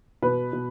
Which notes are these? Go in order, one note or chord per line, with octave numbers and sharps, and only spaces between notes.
B2 B4
B2